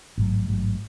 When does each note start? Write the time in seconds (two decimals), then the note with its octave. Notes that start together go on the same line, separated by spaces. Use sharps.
0.18 A1 G#2 F#3
0.48 A1 G#2 F#3